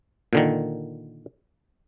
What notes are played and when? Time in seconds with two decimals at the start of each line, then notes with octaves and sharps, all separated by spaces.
0.33 A#2 D3 D#3